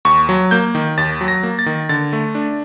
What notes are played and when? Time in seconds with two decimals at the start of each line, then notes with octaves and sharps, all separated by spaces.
0.05 D#2 C#6
0.29 F#3
0.51 A#3 G6
0.75 D#3
0.97 D#2 A6
1.21 F#3
1.28 A#6
1.43 A#3
1.59 A6
1.66 D#3
1.89 D3 A6
2.13 A3
2.35 D4